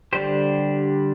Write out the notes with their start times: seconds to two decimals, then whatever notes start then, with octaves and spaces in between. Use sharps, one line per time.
0.13 D3 G3 D4 G4 C5